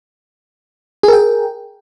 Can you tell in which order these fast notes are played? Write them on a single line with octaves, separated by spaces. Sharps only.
G#4 A#4 G5